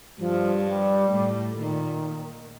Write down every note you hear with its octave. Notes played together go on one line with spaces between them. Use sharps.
G2 F3
G3
A2
A#2 D#3